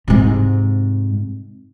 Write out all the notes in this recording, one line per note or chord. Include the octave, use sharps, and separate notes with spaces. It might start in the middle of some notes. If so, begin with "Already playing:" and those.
G#2 C3